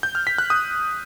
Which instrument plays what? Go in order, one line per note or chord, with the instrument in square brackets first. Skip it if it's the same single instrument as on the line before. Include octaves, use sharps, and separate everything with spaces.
[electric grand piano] G6
F6
B6
F#6
D#6